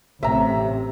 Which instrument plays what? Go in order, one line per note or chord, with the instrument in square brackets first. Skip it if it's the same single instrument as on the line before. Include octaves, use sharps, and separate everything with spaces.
[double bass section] A1 C3 [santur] E5 A#5